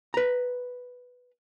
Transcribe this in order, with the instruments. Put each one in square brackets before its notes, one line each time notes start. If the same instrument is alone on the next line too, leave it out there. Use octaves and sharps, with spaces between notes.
[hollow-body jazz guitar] B4 A#5